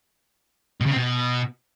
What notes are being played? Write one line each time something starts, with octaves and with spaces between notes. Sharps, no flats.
B2
C#3
C4
B2